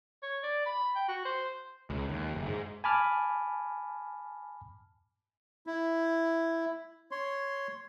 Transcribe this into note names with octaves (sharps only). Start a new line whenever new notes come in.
C#5
D5
B5
G5
F#4
C5
C#2
D#2
F#1
G#2
G#5 A5 B5 D6 F6
E4
C#5 C6